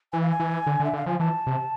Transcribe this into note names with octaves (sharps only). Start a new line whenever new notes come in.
E3 G#5
F5
G#5
E3
D3
D3
E5
D3 F5
F3 G#5
E3 A5
C3